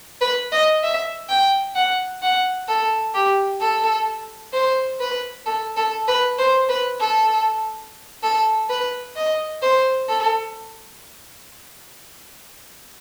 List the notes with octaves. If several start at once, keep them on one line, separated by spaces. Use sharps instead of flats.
B4
D#5
E5
G5
F#5
F#5
A4
G4
A4
C5
B4
A4
A4
B4
C5
B4
A4
A4
B4
D#5
C5
A4